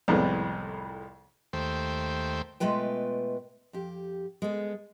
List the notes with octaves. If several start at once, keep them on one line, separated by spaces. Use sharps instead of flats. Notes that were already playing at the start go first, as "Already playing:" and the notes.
C2 F2 A2 G#3 B3
D#2 A3 C5 G5
B2 G#3 A3 F4 B4 G5
F2 G4
G#3 B3 A4